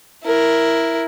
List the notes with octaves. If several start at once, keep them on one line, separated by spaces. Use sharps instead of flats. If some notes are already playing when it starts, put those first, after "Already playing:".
E4 A#4